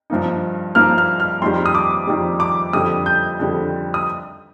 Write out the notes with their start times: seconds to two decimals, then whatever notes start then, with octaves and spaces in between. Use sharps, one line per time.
0.10 G2 F3 A#3 D#4
0.75 G2 F3 A#3 D#4 F6
0.98 F6
1.20 F6
1.42 F2 D#3 G3 C6
1.66 D#6
1.75 D6
2.07 F2 D#3 G3
2.40 D6
2.73 F2 D3 G3 D#6
3.06 G6
3.40 F2 D3 G3
3.94 D#6